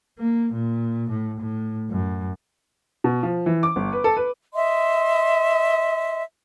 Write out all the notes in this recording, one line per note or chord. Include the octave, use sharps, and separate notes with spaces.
A#3
A#2
A2
A2
F#2
B2
F3
E3
D6
G1
B4
A4
B4
D#5 E5 C6